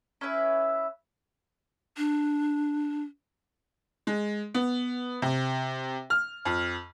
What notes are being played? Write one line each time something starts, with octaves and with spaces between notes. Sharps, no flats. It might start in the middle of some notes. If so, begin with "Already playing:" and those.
C#4 E4 B4 E5
D4
G#3
B3
C3
F6
F2